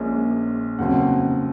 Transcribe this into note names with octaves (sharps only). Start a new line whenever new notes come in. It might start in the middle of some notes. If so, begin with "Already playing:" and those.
Already playing: A#1 A#2 G#3 C#4
F1 D#2 C#3 F#3 C4 F#5